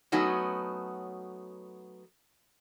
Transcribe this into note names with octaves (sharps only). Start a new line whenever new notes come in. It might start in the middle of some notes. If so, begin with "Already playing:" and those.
F#3 A3 B3 C#4 D#4 F#4